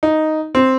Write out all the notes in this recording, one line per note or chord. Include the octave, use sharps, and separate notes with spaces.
D#4
C4